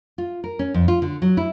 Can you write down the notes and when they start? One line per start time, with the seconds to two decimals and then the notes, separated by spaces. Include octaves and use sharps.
0.18 F4
0.44 A#4
0.59 C#4
0.74 F2
0.88 F4
1.02 D3
1.22 F#3
1.37 E4